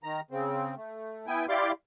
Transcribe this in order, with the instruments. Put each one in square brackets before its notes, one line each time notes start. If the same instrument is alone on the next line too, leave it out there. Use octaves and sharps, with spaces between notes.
[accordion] D#3 A#5
C#3 C4
A3
B3 E4 G5 G#5
E4 G4 D5 F5 C6 D6